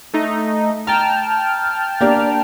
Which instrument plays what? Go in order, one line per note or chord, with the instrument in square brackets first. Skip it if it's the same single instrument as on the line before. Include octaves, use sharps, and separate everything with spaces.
[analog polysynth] A3 D#4
[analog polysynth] G5 A5 F6 [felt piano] A#5
[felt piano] A#3 D4 G4